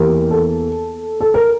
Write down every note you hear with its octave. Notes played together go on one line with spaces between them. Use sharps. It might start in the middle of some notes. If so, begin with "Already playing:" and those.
Already playing: E2 E3 A#3 G4 A#4
A4
A4
A#4